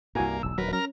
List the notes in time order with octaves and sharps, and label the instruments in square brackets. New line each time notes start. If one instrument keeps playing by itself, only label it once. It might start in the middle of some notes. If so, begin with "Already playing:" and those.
[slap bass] C2 G2 [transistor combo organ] A#3 [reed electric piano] E4 F#4 G#5
[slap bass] E1 B1 E2 [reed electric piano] E6
[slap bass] D#1 D2 D#3 [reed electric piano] F#3 [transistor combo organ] A#4 B4
[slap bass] C#4 [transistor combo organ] A#4 A#5 F6